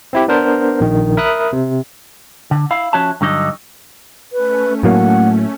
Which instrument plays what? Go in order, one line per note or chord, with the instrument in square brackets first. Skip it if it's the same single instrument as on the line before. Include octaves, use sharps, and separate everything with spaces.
[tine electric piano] C4 E4 G4
B3 D4 A#4 C5
A#1 D#3
A#4 E5 B5 D#6 F#6
C3
[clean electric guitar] D3
E4 F5
F3 C#4 F#4 C#5 E5 A5
G2 D3 F#3 D#4 D#5
[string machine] A3 C#4 [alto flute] B4
[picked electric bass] A2 F#3 A#3 [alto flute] F#5